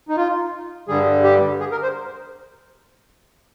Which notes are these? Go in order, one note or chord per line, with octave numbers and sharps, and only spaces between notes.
D#4
F4
G2 D3 G3 G#4
G4
G#4
A#4
C5